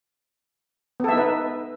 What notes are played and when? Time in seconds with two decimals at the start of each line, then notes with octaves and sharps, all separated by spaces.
1.00 B3
1.04 A4
1.08 E5
1.13 D#4
1.17 B4